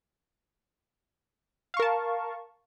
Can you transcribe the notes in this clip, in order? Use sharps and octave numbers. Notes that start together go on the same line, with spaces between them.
A#4 F5 A5 C#6